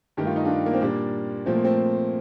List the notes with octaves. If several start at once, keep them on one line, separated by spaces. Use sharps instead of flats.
G2 D#3 A3 G4
F4
D#4
D4 F4
A#3
C4
A#2 G3 A#3 D4
A#2 F3 A3 C4
A#3
A3 C4